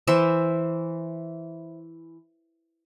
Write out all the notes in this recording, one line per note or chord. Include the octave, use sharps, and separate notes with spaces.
E3 C5 E5